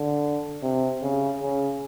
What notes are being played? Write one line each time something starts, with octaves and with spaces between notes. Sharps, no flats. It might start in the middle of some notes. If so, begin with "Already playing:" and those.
Already playing: D3
C3
C#3
C#3